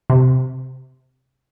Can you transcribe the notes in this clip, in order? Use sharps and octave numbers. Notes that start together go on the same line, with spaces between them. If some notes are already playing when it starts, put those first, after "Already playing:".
C3